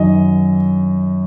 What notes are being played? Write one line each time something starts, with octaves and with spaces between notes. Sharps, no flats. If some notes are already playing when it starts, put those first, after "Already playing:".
Already playing: F#2 D#3 D#5